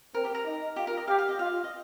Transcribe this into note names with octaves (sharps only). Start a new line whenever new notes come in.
C4 A#4
G4
A#4
D#4
F4 G4
A#4
D#5
G4 F5
F5
D#5
F4 F5
D#5